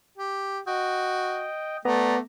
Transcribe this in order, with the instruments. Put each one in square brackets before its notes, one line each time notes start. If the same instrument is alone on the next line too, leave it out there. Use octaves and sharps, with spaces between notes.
[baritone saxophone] G4
[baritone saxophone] F#4 [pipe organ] D#5 G5
[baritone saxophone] A3 [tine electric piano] B3 [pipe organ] D5 A#5